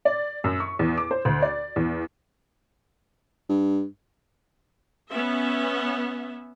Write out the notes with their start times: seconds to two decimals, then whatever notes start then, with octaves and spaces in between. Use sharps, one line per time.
0.05 D5
0.44 F#2
0.60 C#6
0.79 E2
0.98 D6
1.11 C5
1.25 D2
1.42 D5
1.76 E2
3.49 G2
5.10 B3 C#4 E5